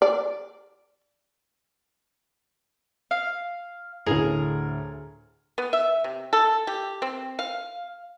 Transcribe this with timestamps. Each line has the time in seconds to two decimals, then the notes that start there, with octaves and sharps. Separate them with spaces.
0.02 D5
3.11 F5
4.06 D2 A2 G#4 A#4
5.58 B3
5.73 E5
6.04 C3
6.33 A4
6.67 G4
7.02 C4
7.39 F5